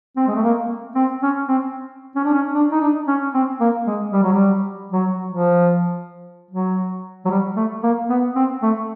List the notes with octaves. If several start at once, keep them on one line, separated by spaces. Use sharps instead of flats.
C4
G#3
A3
A#3
C4
C#4
C4
C#4
D4
C#4
D4
D#4
D4
C#4
C4
A#3
G#3
G3
F#3
G3
F#3
F3
F#3
F#3
G3
A3
A#3
B3
C4
A3